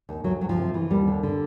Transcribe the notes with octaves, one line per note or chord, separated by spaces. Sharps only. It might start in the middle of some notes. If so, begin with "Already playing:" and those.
D#2
D2 F#3
D2 F#3
F3
C3
E3
D#2 G3
D3
D3